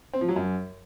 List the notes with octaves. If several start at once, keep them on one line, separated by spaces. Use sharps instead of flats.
C4
F3
F#3
F#2